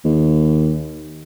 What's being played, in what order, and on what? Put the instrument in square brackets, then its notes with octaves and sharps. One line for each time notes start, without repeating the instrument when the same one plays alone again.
[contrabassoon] D#2